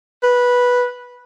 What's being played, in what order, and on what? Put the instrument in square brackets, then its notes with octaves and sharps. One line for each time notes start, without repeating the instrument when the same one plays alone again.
[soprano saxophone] B4